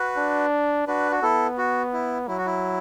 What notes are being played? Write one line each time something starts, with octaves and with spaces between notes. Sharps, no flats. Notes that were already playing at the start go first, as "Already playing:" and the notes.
Already playing: F#4 B4
D4
D4 F#4 B4
F#4
B3 E4 A4
F#4
E4
F#3 E4
F#4
E4